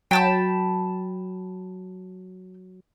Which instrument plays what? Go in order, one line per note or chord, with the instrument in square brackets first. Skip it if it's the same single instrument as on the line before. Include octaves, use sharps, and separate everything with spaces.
[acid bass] F#3 [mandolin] G5 A5 B5